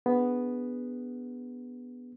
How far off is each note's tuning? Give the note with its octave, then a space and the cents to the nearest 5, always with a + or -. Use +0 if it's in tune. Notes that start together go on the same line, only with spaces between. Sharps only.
B3 +0 D4 +0 G#4 +0